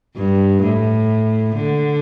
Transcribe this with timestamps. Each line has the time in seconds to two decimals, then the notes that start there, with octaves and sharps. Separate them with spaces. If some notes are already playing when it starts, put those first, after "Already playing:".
0.17 G2
0.63 A2
1.55 D3